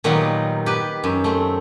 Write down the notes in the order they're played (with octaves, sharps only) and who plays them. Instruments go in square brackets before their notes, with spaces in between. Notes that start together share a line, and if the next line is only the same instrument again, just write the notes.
[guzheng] A#2 D#3 F#3 G3 B3 D#4
G4 B4
F#2
A3 C4